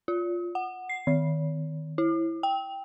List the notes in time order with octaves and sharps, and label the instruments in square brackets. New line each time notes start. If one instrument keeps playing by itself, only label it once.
[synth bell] F4
F#5
C7
D#3
E4
G5